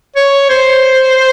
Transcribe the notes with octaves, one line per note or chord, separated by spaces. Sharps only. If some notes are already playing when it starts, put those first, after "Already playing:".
C#5
C5